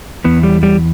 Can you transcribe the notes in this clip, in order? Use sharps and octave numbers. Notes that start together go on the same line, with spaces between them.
E2 E3 B3
G3
G3